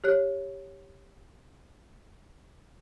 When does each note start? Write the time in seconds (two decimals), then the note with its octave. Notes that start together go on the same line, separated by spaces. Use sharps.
0.04 G4 C#5 F#6